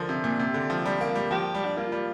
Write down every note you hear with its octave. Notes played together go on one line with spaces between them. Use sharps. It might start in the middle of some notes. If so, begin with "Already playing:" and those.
Already playing: D3 F3 A#4
C3
A#2
C3 G4
D3
F3
G3
A#3
G3
F3 G4
G3
D4
A#3 F4
G3